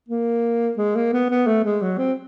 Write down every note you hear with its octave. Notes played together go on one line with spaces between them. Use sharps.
A#3
G#3
A#3
B3
B3
A3
G#3
F#3
C4